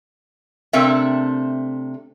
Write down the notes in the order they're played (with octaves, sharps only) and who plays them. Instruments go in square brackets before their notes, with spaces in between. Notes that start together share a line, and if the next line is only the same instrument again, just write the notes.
[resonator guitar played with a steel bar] C3 A3 C4 D4 A#4 E5